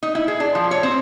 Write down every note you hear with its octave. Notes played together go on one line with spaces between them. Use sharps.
D#4
E4
G#4
D4
F3
C#5
C4